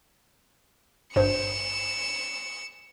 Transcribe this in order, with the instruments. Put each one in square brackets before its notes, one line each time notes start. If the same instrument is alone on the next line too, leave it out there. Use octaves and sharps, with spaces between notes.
[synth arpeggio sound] G#1 G2 C5 [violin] C#7 E7